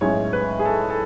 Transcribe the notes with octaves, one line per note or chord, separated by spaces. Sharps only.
B1 A2 G#3 C#4 C#5
B4
G#4
A4
A4